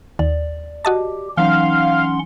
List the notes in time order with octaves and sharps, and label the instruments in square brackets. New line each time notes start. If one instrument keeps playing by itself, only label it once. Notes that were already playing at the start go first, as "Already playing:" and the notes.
[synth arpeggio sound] D#2 [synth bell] D5
[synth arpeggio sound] F#4 D#5 A5 [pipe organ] G4
[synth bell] E3 F#3 D#4 [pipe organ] C#4 F#5 C6 [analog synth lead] F5